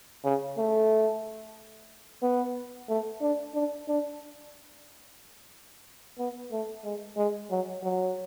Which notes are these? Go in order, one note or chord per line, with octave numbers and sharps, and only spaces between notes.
C#3
A3
B3
A3
D4
D4
D4
B3
A3
G#3
G#3
F#3
F#3